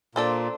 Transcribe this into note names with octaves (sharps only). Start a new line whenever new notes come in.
A#2 D4 A4 C5